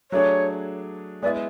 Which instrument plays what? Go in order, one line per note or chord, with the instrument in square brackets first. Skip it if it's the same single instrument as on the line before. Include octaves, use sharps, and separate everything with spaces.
[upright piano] F#3 A3 D4 G#4 [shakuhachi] C#5
[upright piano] G#3 B3 E4 [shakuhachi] D5